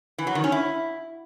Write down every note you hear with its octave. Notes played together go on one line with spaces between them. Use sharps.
E3
F#3
D#3
C#4
E4